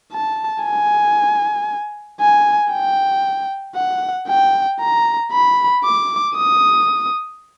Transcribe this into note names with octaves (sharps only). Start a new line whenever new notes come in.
A5
G#5
G#5
G5
F#5
G5
A#5
B5
D6
D#6